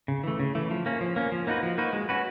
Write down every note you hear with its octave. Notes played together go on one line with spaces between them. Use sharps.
C#3
E3 A3
C#3
E3 A3
F3
A#3 C#4
F3
A#3 C#4
F3
A#3 D#4 F#4 B4
F3
A#3 D#4 F#4 B4
G#3
C#4 F#4 B4